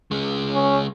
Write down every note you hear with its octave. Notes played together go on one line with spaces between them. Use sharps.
C#3 G#3
C#4